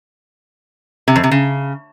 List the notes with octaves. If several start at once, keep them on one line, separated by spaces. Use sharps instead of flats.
C3
F2
C3
C#3